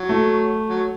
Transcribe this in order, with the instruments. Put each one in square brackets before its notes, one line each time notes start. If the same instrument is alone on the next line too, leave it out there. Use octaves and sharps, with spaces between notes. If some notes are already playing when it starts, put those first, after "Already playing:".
Already playing: [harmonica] F#3
[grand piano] A3
[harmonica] F#3